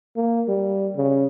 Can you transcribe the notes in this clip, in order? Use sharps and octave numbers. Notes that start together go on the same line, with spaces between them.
A#3
G3
C#3